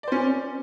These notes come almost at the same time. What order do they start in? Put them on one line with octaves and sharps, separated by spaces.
D5 C5 C#4